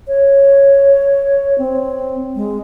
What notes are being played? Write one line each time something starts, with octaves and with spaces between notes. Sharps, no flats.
C#5
C4
G#3